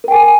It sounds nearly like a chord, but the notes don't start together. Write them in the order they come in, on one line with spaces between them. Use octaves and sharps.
A#4 G5 G#5